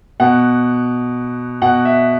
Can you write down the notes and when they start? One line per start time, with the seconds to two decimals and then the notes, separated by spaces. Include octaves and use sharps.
0.20 B2 F#5
1.62 B2 F#5
1.85 E5